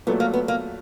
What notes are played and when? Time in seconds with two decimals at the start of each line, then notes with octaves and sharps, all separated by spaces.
0.07 A#2 F#3 A3 B3
0.20 A#3
0.34 B3
0.48 A#3